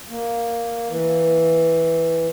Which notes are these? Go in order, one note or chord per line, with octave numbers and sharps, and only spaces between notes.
A#3
E3